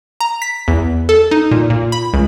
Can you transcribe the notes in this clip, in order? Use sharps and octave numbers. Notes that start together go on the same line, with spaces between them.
A#5
B6
E2
A4
D#4
A#2
A#2
B5
C#2